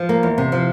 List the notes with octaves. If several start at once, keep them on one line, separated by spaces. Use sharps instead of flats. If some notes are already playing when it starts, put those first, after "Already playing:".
Already playing: F3
A#3
E2
C3
F3